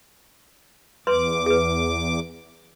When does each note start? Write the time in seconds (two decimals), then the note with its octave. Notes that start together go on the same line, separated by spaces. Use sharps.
1.07 E2 B4 C6 D6
1.46 G#4 B4